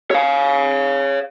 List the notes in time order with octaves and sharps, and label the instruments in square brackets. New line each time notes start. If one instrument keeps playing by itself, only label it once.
[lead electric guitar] C#5 F5